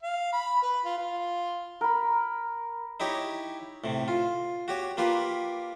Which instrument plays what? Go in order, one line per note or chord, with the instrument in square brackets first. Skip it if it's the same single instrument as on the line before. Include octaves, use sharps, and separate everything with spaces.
[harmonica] F5
B5
B4
F4
F4
[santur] A#4 B5
[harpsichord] D#4 E4 G4 C#5
A2 C3
F4
F#4 G4 C#5
A#3 F4 G4 B4